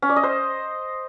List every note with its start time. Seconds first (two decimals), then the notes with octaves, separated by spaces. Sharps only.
0.02 C#4
0.09 D5
0.16 D#5
0.23 C5